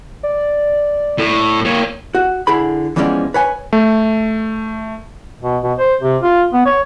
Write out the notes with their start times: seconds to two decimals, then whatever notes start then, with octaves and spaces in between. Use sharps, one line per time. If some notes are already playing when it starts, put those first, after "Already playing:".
0.23 D5
1.18 A2
1.66 A#3 C#5
2.15 F#4
2.47 D3 E4 G#4 B5
2.96 E2 E3 F3 G#3 C#4 D5
3.34 B4 C#5 G#5
3.73 A3
5.43 B2
5.63 B2
5.79 C5
6.01 C3
6.23 F4
6.53 B3
6.66 C#5